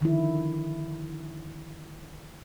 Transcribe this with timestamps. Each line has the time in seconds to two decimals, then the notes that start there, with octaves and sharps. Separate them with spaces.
0.01 D3 D#3 F3 E4